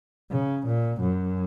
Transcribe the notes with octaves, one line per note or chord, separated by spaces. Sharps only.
C#3
A#2
F#2